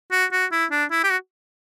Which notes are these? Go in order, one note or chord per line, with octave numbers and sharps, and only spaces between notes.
F#4
F#4
E4
D4
E4
G4
F#4